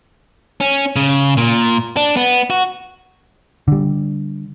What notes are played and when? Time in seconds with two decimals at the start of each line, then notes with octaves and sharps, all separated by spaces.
0.61 C#4
0.96 C#3
1.37 A#2
1.97 D4
2.17 B3
2.50 F#4
3.68 D3 G3